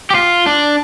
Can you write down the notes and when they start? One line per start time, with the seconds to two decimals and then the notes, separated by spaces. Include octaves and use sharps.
0.10 G4
0.15 F4
0.46 D4